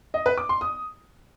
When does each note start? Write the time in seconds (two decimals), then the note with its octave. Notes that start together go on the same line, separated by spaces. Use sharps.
0.14 D#5
0.26 B4
0.38 D6
0.49 C6
0.61 D#6